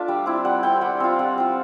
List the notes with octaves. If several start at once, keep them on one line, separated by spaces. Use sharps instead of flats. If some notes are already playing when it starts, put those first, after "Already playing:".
Already playing: A3 D4 F4 D5 E5
G3
C4 E4
G3 F#5
C4 E4 G5
G3 F#5
C4 F4
G3 F#5
C4 F4